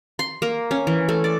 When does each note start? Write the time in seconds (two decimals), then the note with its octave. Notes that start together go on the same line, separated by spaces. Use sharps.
0.19 C6
0.42 A#3
0.71 C#4
0.87 E3
1.09 A3
1.24 D5